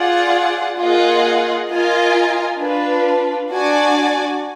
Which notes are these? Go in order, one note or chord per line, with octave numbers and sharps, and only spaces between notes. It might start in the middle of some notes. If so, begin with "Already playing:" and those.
Already playing: F4 G#4 D5 F#5
A#3 F4 G#4 D#5 F#5
F4 A#4 D#5 G#5
D4 F4 B4
D4 F#4 D5 G#5